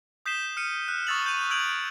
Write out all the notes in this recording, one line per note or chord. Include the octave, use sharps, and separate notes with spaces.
D#6 G6 B6 C7 E7 G7
F6 C#7 D#7
F#6
C#6 D#6 E6 A6 F7 F#7
G6 D#7 F7
E6 G6 G#6 D7 F7 F#7